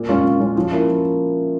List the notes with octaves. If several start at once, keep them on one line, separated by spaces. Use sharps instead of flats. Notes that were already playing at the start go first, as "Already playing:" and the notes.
Already playing: A#2
G#3 C#4 F4
A#2
G#3 C#4 F4
F3
A#3 C#4 E4
F3